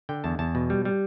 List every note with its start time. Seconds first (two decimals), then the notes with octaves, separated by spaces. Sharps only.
0.09 D3 G5
0.24 E2 A5
0.39 E2 A5
0.55 B2
0.70 G3
0.85 G3